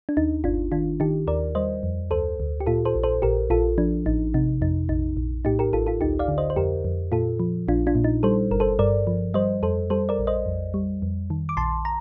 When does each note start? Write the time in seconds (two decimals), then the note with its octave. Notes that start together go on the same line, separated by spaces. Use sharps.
0.09 D4
0.17 D#2 D#4
0.44 G1 D4 F4
0.72 D#3 D4 F4
1.00 D#3 D#4 G4
1.27 D#2 A#4 D5
1.55 G3 C5 D#5
1.83 F2
2.11 D2 A4 C5
2.40 D2
2.60 G4
2.66 A#2 F4 A4
2.85 A4 C5
2.95 A#1
3.03 A4 C5
3.22 A#1 G4 A#4
3.50 A#1 F4 A4
3.78 F3 D4
4.06 A1 D#4
4.34 C3 D#4
4.61 F2 D#4
4.89 A#1 D#4
5.17 A#1
5.45 A2 D#4 G4
5.59 G4 A#4
5.73 A1 F4 A4
5.87 F4 A4
6.01 D2 D#4 G4
6.19 D5 F5
6.28 D3
6.38 C5 D#5
6.50 C5
6.56 F2 G4 A#4
6.85 F2
7.12 A#2 F4 A4
7.39 F3
7.68 A#1 D4 F4
7.87 D4 F4
7.95 A#2
8.04 D#4
8.23 G3 A4 C5
8.51 G1 A#4
8.60 A4 C5
8.79 G2 A#4 D5
9.07 F3
9.34 G3 C5 D#5
9.63 F2 A4 C5
9.90 G3 A4 C5
10.09 A#4 D5
10.19 A#1
10.27 C5 D#5
10.46 F2
10.74 G3
11.02 F2
11.30 D#3
11.49 D6
11.57 A#1 A5 C6
11.85 A#5